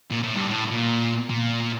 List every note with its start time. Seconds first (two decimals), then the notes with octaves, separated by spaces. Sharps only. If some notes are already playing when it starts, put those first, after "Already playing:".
0.11 A#2
0.23 A2
0.35 G2
0.47 A2
0.70 A#2
1.30 A#2